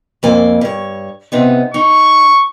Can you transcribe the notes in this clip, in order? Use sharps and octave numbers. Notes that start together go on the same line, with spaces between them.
F2 A#3 G#5
G2 C#5
C3 B3 D#4
D#4 C#6